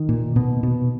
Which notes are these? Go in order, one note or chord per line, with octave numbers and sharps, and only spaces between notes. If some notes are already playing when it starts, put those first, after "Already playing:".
Already playing: D#3
A#2
B2
B2